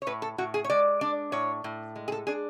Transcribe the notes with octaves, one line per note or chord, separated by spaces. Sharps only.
C#5
A2 B4
A4
A2 F#4
G#4
C#5
G#3 D5
D4 D5
A2 C#5
A2
G#3
G#4
A4
D4 G#4